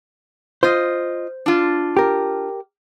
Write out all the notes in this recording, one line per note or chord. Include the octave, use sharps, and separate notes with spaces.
F4 C5 D#5
D4 F4
G4 A#4